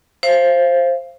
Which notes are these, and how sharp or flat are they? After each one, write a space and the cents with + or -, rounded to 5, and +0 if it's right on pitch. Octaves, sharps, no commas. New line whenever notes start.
C5 +10 F5 -25